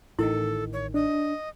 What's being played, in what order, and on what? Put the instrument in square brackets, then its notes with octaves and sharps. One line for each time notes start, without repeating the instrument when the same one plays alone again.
[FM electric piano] A1 D#3 [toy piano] E4 [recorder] A4
[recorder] C#5
[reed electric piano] D4 [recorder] D#5